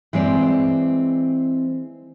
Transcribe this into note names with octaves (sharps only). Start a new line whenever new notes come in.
E3 G#3 C4 D5